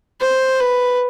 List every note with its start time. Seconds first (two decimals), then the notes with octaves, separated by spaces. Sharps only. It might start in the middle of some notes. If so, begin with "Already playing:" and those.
0.20 C5
0.60 B4